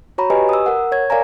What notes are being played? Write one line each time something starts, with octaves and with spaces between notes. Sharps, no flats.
F#4 C#5 A#5 B5
G4 B4 D#5 G#5
D#6 E6
A#4 F#5
C#5 G#6
A#4 D5 F5 G#5 A#5